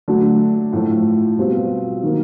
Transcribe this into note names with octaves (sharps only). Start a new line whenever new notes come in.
D3 F#3 A3
A2 F3 A3
B2 G3 C4 F4
D#3 F#3 A#3